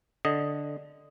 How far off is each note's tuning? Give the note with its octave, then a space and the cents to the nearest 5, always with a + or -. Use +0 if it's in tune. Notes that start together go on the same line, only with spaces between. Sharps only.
D3 +0 D#5 +0